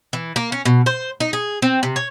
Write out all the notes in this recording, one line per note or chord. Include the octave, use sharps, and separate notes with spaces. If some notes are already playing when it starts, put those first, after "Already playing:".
E3
A#3
C#4
B2
C5
D#4
G#4
C4
C3
C#5